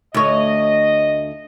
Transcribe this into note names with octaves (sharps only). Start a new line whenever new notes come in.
D2 C#5 D#5